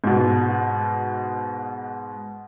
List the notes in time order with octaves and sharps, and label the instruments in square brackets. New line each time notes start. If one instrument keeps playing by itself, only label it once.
[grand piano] G#2 B2